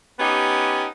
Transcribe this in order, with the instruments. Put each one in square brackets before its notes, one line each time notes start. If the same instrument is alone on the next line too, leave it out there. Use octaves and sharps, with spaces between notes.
[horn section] B3 C#4 D#4 G4